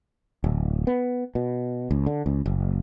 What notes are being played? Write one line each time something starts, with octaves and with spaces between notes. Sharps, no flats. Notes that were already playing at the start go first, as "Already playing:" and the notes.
D1
B3
B2
C#2
D3
C#2
F#1